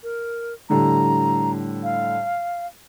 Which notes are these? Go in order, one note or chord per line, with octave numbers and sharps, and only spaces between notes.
A#4
A2 D3 G3 A#5
F5